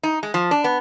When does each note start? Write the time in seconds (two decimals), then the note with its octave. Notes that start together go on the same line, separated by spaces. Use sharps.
0.03 D#4
0.23 G#3
0.34 F3
0.51 D4
0.64 B3